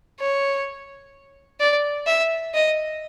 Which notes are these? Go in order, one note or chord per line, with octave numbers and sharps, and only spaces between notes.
C#5
D5
E5
D#5